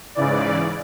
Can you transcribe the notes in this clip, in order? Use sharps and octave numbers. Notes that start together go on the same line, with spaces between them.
G#2 C#3 E3 D5